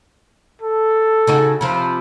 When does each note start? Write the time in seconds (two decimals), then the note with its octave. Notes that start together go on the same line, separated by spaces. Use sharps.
0.62 A4
1.27 C#3 D#4 F#4
1.61 C3 F3 C4 B5